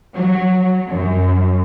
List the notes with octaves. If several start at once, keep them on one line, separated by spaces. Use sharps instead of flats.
F#3
F#2